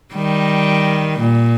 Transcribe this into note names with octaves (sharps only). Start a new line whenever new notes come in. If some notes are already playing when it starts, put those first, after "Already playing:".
D#3 G3
A#2